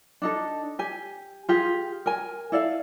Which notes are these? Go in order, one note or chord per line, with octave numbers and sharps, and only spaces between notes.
D4 D#4 A4
G4 G#5
F4 G4 G#4
A#4 G#5
E4 A4 D5 F5